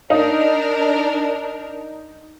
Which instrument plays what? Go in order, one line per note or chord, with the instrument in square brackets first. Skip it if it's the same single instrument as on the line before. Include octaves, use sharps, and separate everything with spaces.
[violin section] D4 A#4 [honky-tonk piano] D#4